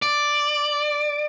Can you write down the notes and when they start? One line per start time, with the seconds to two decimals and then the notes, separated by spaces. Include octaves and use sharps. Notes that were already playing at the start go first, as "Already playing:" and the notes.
0.02 D5